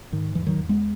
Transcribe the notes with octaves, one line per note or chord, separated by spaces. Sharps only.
G#2 D#3
E2 E3
D#3 F#3
E2
G#3 B3